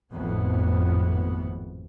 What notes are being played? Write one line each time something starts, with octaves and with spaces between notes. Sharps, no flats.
G#1 F2 A2 B3